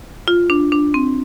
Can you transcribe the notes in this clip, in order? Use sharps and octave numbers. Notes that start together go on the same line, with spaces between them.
F4
D4
D4
C4